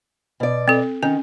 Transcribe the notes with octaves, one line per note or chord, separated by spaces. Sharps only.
B2 D5
C4 A4
D#3 C#4